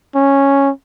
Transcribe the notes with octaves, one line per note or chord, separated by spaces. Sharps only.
C#4